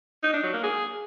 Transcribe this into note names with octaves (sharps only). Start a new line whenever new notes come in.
D#4
D4
F#3
A#3
G#4